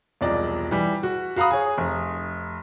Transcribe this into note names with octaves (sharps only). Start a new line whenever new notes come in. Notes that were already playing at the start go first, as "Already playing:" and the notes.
E1 C2 F3 D5 D#5
E3 G3
F#4
F#4 F5 A#5 B5 D#6
G#4 C#5
F1